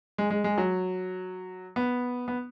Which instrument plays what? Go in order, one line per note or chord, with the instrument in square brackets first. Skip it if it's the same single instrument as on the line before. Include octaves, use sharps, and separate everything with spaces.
[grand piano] G#3
G#3
G#3
F#3
B3
B3